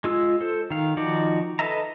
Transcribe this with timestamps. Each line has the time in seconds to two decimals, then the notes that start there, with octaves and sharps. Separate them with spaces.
0.04 G#3 F4 E6
0.41 A4 C5
0.70 D#3 F5
0.97 D#3 F3 D#4 F#4 D5
1.59 A4 B4 D#5 E5 A#5